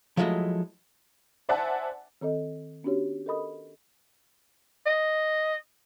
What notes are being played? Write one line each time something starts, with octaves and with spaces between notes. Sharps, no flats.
F3 F#3 G#3 A3 E4 D#5
C5 D5 E5 F#5 G#5 A5
D#3 C4 A4 D#5
B3 C#4 D4 F#4 G4 C#5
A4 A#4 D#5 B5 D#6
D#5